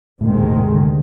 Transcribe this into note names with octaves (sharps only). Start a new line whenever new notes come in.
D2 A2 C3 D#3 G#3 C4
A#2
A2
G#2
D3